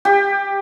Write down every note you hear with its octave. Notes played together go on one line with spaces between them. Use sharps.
G4